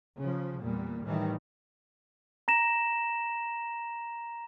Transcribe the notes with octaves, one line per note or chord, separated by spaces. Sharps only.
C#3 F3
E2 A#2 G3
A2 D#3 E3 G3
A#5 A#6 E7